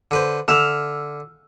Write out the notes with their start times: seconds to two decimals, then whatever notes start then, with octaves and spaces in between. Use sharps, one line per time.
0.11 D3 B4 C5
0.48 D3 E5 E6 F6